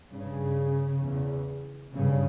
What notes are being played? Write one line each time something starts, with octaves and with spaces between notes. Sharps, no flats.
G2 C#3
E2 C#3
G2 C#3